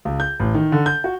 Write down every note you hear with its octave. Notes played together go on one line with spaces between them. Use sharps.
C#2
G6
A1
D#3
D3
G6
F#4